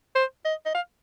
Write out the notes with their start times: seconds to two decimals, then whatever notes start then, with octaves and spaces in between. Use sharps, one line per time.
0.15 C5
0.45 D#5
0.66 D#5
0.74 F5